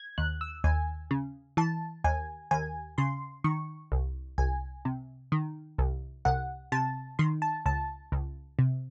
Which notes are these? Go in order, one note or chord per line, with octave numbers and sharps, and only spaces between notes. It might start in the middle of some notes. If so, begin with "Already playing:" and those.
Already playing: G#6
D#2 F#6
E6
D#2 G#5
C#3
E3 A5
D#2 G#5
D#2 G#5
C#3 C6
D#3 C#6
C2
C2 G#5
C3
D#3
C2
C2 F#5
C3 A5
D#3 C6
A5
C#2 A5
C#2
C3